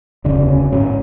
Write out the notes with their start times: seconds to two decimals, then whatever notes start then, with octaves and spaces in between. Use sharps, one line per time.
0.24 E1 D2 C#3 D4
0.48 C#4
0.72 A1 G#2 C#4